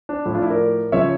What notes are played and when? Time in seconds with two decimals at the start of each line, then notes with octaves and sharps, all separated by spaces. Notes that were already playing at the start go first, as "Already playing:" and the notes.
0.09 D4
0.25 A2 F3 E4
0.35 D4 F4
0.42 E4
0.50 A#4 D5
0.92 C#3 F3 C#5 E5